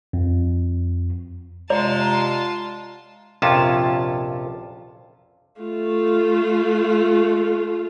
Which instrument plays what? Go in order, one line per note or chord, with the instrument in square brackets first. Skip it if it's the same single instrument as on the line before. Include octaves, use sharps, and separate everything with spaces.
[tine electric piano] F2
[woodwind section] C3 G#3 [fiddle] F4 A5 [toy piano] D5 [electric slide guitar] F#5 A#5
[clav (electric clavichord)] A#1 F2 C3 C#4 F4 A5
[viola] A3 F4